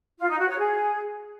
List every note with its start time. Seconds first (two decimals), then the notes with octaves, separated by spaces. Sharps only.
0.19 F4
0.29 D#4
0.38 F#4
0.48 C#5
0.58 G#4